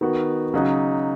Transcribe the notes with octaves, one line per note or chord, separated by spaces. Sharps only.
D#3 B3 F#4
C#3 F#3 D#4 F#4